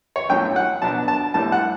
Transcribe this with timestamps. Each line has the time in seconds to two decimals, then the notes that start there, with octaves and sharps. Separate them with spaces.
0.16 C#5
0.29 A1 A2 F#3 C#4 G5
0.56 F#5
0.82 B2 F#3 B3 D4 A5
1.08 A5
1.34 A1 A2 G3 A5
1.52 F#5